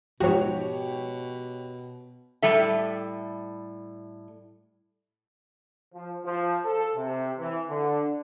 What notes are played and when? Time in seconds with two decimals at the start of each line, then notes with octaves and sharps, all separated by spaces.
0.20 G#2 B2 F3 F#4 G4 C#5
2.42 A2 G3 A4 E5
5.93 F3
6.24 F3
6.64 A4
6.95 C3
7.38 E3
7.68 D3